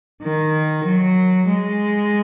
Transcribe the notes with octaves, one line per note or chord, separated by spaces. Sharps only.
D#3
F#3
G#3